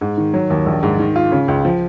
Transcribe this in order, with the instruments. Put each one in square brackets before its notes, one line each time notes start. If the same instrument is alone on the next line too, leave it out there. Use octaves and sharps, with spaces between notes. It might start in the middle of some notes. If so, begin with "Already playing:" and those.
[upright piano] G#2
D#3
F#3
D#2
A#1
G#2
D#3
F4
C#3
C#2
F3